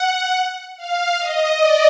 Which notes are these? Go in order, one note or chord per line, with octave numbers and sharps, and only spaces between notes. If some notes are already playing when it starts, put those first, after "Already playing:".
Already playing: F#5
F5
D#5
D5